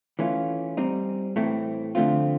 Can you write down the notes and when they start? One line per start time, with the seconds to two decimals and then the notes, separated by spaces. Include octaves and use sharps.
0.19 E3 A3 C#4 F4
0.77 G3 C4 D#4
1.36 A2 E3 A3 C4
1.95 D3 F3 A3 C4 F4